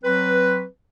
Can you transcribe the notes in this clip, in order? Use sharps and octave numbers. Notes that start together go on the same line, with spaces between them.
F#3 C4 B4